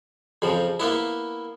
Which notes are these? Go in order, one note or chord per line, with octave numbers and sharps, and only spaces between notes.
F2 C#3 F3
A#3 B3 E4